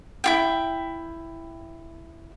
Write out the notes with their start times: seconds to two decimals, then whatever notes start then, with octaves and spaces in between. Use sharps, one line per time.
0.24 E4 F4 G5